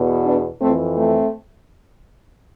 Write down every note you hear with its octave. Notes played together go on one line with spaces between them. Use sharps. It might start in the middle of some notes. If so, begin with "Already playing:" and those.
Already playing: E2 B2
B3 D4
F2 E3 A3 C4
A3 C4